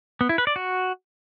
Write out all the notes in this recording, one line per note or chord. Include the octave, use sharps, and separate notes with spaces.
B3
E4
B4
D5
F#4